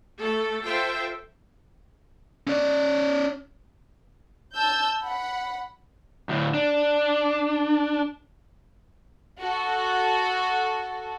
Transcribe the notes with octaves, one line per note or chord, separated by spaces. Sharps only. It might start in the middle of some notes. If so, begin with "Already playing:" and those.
A3 A4
F4 A4 C5 E5 G5
C#4 D5
A5 E6 G6
F#5 B5
D2 A2
D4
F#4 A4